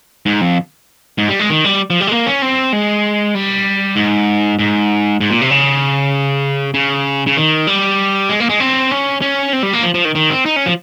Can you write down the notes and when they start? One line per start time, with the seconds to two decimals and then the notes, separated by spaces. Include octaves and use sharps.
0.26 G#2
0.41 F2
1.18 G#2
1.29 G3
1.39 G#3
1.50 D#3
1.65 G3
1.90 F3
2.01 G3
2.07 G#3
2.12 A#3
2.27 C#4
2.42 C4
2.73 G#3
3.35 G3
3.96 G#2
4.59 G#2
5.20 G#2
5.30 A#2
5.41 C3
5.50 C#3
6.74 C#3
7.27 C#3
7.37 D#3
7.67 G3
8.29 G#3
8.40 A#3
8.49 G#3
8.60 C4
8.91 C#4
9.22 C#4
9.53 C4
9.63 G3
9.73 A#3
9.83 F3
9.94 F3
10.05 D#3
10.15 D#3
10.30 C4
10.46 D#4
10.56 C#4
10.66 F3